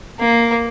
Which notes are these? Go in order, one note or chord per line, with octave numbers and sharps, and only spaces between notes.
A#3